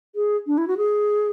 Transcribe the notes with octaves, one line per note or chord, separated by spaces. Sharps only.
G#4
D4
E4
F#4
G#4